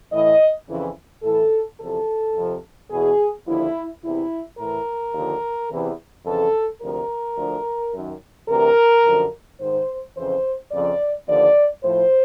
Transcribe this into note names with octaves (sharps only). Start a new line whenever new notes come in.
A2 E3 D#5
F2 C#3 E3
A2 E3 A4
E2 C3 F3 A4
F2 C3 F3
E2 B2 G#4
D#2 D3 F3 E4
E2 C3 E3 E4
A2 E3 A#4
D#2 D3 F3
E2 C3 E3
F2 C#3 E3 A4
D2 C3 F3 A#4
D2 D3 F3
F#2 D#3
D2 C3 E3 A#4
F#2 D3 F3
G#2 D#3 C5
F2 C#3 E3 C5
F2 C#3 F3 D5
D#2 D3 F3 D5
A2 F3 C5